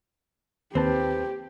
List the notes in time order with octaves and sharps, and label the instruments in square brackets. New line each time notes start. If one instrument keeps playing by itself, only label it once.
[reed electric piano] D#2 B4 A5 [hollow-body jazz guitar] C4 [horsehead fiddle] G4